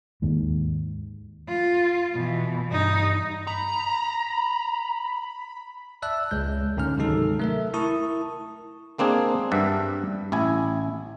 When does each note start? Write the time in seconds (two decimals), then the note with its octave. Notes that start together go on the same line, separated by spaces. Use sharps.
0.22 D#2 G#2
1.48 F4
2.15 B2 E3
2.70 G2 D#4
3.47 A#5 B5
6.02 D5 E5 A5 E6 F#6
6.31 C#2 G#3 G6
6.77 D2 G#2 D3 C#4 F6
6.97 C3 D#3 F#3 G#3 D#4 A4
7.39 A3 A#4 E5
7.74 E4 A#4 A5 C#6 D#6
8.98 G#3 A#3 C4 D4 G#4
9.52 G2 G3 E5 F#5 A5
10.32 A1 E4 G#5